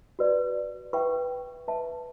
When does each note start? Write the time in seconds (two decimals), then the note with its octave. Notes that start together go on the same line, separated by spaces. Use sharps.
0.19 F#4 B4 D5
0.93 B4 E5 G5 C#6
1.68 B4 E5 A5